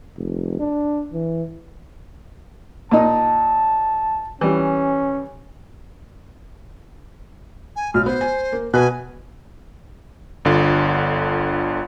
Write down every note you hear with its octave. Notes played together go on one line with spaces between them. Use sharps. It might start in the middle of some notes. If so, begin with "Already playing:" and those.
F1
D4
E3
A#2 D#4 A5
E3 G3 C#4
G#5
B1 F6
B3 C5
G#5
A#3
B2 B4 G#5 F#6
G1 D3 F4